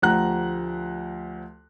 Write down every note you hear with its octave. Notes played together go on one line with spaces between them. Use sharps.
D2 F3 G4 F#5 A#5 F#6